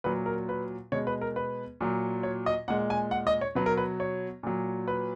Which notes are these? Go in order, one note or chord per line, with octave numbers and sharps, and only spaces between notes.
A#2 F#3 B4
A#4
B4
B2 G#3 C#5
B4
A#4
B4
A#2 F#3
C#5
D#5
A#2 G#3 F#5
G#5
F#5
D#5
C#5
B2 F#3 B4
A#4
B4
C#5
A#2 F#3
B4